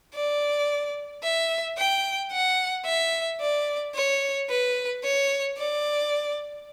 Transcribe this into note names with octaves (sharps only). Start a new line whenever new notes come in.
D5
E5
G5
F#5
E5
D5
C#5
B4
C#5
D5